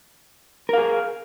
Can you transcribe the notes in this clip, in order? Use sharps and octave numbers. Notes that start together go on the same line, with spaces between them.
G#4 A#4 F5